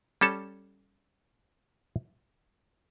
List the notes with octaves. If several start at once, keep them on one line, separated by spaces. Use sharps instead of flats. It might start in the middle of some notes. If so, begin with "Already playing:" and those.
G3 C#4 A4 A5